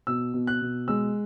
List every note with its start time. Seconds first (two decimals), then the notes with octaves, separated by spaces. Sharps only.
0.07 B2 E6
0.34 B2
0.47 F#6
0.62 B2
0.88 G#3 E6